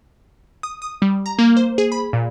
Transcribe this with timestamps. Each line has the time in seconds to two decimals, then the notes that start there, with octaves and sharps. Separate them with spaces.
0.63 D#6
0.82 D#6
1.02 G3
1.26 A#5
1.39 A#3
1.57 C5
1.78 G#4
1.92 B5
2.13 A#2